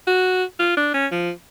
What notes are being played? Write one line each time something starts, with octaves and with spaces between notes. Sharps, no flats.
F#4
F4
D4
C#4
F3